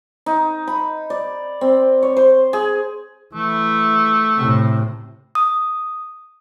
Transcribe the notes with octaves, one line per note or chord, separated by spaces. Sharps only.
D#4
B5
D5
C4
C#5
C5
G#4
E3 A3
A2 C3
D#6